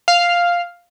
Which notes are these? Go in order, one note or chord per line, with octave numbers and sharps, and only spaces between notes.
F5